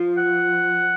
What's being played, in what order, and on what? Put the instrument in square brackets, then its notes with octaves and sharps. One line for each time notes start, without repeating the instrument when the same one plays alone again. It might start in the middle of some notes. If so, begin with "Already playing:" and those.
Already playing: [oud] F3
[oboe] F#5